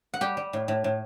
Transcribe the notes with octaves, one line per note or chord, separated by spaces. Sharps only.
F#5
G3 G4 G5
G3
A2
A2
A2